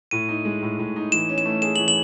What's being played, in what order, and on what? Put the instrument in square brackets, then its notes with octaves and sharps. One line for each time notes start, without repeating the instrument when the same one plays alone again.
[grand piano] A2 [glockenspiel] D#7
[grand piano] D#4
G#3
A2
A2
D#4
[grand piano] E3 [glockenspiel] E7
[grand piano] C#4
[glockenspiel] E7
[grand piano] A3
[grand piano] G#4 [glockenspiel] E7
[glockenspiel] F#7
[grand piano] E3
[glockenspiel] F#7